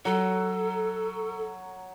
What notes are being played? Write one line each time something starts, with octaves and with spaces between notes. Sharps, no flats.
F#3 A4